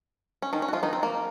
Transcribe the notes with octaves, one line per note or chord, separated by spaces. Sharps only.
C#4
D#3 D#4
C#4
F#4
F3 F4
D#3 D#4
C4
A#3